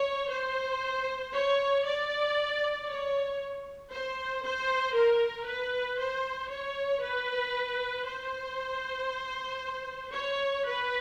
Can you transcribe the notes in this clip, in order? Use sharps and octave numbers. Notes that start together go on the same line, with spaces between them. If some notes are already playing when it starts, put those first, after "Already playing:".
Already playing: C#5
C5
C#5
D5
C#5
C5
C5
A#4
B4
C5
C#5
B4
C5
C#5
B4